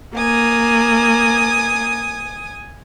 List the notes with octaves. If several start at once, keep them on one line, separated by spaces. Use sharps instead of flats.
A#3 G#5 D#6